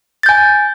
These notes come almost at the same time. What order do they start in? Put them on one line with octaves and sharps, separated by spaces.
A6 G6 G#5